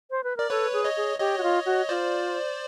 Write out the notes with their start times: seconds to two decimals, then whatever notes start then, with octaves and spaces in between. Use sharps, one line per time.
0.10 C5
0.24 B4
0.37 A#4 D5
0.50 A4 B4 C#5
0.73 G#4
0.84 C#5 D#5
0.97 G#4
1.19 G4 C#5 D#5
1.38 F#4
1.43 F4
1.66 F#4
1.89 F4 C5 D5